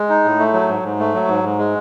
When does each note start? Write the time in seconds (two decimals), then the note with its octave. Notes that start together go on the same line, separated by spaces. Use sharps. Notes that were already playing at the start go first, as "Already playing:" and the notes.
Already playing: G#3
0.09 D#4
0.24 A2
0.39 A3
0.53 F#3
0.69 G#2
0.83 G#2
0.99 A3
1.14 F#3
1.28 G#2
1.44 G#2
1.59 G#3